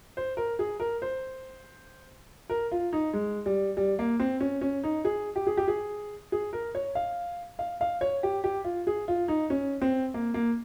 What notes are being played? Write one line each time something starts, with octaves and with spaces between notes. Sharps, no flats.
C5
A#4
G#4
A#4
C5
A#4
F4
D#4
G#3
G3
G3
A#3
C4
C#4
C#4
D#4
G#4
G4
G#4
G4
G#4
G#4
A#4
C#5
F5
F5
F5
C#5
G4
G4
F4
G#4
F4
D#4
C#4
C4
A#3
A#3